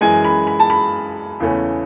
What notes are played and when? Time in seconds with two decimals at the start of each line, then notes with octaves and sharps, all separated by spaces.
0.01 F#2 E3 G#3 G#5
0.25 B5
0.47 B5
0.60 A5
0.70 B5
1.40 E2 C#3 E3 A3 C#4